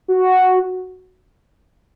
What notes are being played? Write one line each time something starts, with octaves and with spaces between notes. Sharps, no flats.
F#4